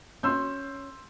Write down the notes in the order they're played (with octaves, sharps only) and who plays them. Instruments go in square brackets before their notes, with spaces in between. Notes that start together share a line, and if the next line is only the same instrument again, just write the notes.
[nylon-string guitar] C#4 [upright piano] C6 E6 G6